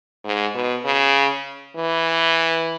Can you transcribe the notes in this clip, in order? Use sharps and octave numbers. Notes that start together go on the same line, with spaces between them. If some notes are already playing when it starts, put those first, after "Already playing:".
G#2
B2
C#3
E3